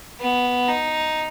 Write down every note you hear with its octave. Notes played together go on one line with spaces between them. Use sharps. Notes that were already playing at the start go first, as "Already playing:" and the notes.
B3
D#4